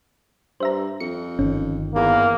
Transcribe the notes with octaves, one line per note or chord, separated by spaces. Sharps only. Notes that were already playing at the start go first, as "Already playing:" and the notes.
G2 C5 E5 A#5
F2 C#7
G1 D#3 C#4
E2 A#3